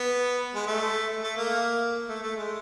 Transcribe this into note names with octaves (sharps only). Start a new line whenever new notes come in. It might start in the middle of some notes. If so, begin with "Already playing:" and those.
Already playing: B3
G#3
A3
A3
A#3
A3
A3
G#3